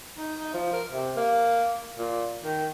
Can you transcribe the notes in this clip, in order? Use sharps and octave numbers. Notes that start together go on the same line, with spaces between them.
D#4
D#4
F3
A#4
C3
A#3
A#2
D#3